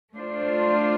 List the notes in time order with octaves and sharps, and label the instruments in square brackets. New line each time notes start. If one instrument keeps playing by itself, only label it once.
[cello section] A3 D4 F4 C5